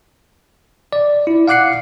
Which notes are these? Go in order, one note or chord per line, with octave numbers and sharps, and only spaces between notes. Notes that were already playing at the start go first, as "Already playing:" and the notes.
D5
E4
F5 F#5 D6 F#6 C7 C#7